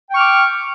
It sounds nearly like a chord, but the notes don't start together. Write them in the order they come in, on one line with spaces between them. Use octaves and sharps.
G5 C#6 F6 D6